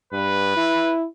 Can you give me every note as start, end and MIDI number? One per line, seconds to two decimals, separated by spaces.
0.13 0.56 43
0.13 0.94 71
0.57 1.06 64